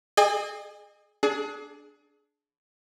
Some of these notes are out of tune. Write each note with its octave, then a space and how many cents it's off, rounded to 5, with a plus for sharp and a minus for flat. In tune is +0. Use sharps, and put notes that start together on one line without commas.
G#4 +30 D#5 -35 G#5 -40
D4 +0 G#4 +30